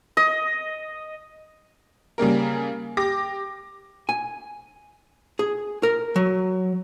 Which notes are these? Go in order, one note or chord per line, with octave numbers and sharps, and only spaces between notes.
D#5
C#3 G3 A#3 A#4
G4 D6 A#6
G#5
G#4
A#4
F#3